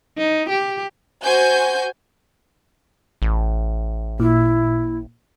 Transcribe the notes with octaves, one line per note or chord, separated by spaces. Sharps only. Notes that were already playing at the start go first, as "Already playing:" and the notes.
D#4
G4
F#4 C5 G#5 G6
A1
A#2 E4